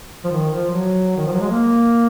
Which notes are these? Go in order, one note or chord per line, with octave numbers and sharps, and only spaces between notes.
F3
D#3
F3
F#3
D#3
F3
F#3
G#3
A#3